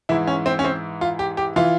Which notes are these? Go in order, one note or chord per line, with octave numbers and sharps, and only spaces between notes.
G#2 E3 E4
C#4
C4
C#4
C4
F4
G4
G4
E3 F4